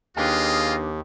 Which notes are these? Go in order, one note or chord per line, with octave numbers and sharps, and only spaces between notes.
D#2 D4 F4 G#4 B4 D#5 F5 G5